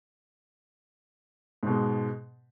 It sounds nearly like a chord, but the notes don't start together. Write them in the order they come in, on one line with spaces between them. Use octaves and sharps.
G#2 B2 G#3